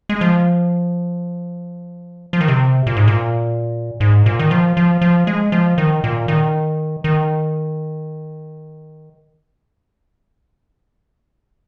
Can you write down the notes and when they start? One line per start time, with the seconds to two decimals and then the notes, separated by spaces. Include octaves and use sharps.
0.09 G#3
0.21 F3
2.33 F3
2.41 D#3
2.48 C3
2.87 A#2
2.97 G#2
3.08 A#2
4.00 G#2
4.26 A#2
4.39 D#3
4.51 F3
4.77 F3
5.01 F3
5.27 G#3
5.52 F3
5.78 D#3
6.04 A#2
6.28 D#3
7.04 D#3